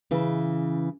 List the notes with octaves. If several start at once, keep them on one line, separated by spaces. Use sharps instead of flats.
C#3 E3